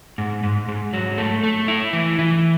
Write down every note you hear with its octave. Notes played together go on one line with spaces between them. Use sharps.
G#2
G#2
G#2
F#3
A3
A3
E4
E3
E3